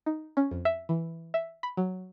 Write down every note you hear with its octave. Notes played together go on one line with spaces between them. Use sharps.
D#4
C#4
F2
E5
E3
E5
B5
F#3